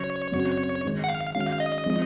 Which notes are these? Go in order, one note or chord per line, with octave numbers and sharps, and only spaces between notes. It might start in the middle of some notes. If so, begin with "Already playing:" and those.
Already playing: C#3 F#3 C#4 C#5
F#2 C#3 F#3 C4 F#4
G#2 D#3 G#3
F#5
F5
D#3 G#3 C#4 F#4 F5
D#5
F3 G#3 C4 D#4